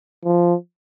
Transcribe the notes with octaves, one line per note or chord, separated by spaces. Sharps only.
F3